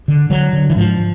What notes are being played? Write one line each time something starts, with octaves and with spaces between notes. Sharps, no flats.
D3
D3 F#3
D3
E3
G#2 F3